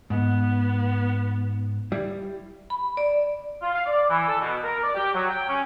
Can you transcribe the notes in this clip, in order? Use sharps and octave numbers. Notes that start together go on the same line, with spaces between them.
G#2 B3
G3 E4
B5
D5
F4
F5
D5
E3
A4
B2
A#4
D5
G4
F#3
G5
C#4